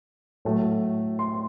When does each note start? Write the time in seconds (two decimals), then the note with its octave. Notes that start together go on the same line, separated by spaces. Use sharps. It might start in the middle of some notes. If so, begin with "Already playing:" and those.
0.45 A2 F#3 A3
1.19 C6